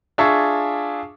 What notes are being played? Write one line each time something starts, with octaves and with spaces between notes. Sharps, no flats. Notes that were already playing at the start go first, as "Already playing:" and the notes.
D4 F4 G#4 E5 A5 C#6